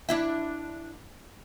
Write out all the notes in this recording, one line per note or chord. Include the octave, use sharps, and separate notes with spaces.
D4 E4 E5